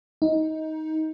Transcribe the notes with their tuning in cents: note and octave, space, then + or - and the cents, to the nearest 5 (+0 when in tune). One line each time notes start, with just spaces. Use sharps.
D#4 +20